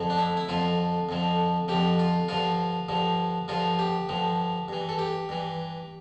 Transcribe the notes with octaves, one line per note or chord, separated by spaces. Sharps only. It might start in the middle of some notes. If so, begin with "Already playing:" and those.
Already playing: F2 D3 F3
D4
E4
E4
F2 D3 F3 F4
F2 D3 F3
F2 D3 F3 G4
F4
G2 D3 F3 F4
G2 D3 F3
G2 D3 F3 F4
G4
G2 D3 F3
G2 E3
A4
G4
G2 E3